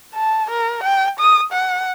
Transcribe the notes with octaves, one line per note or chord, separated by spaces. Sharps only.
A5
A#4
G5
D#6
F#5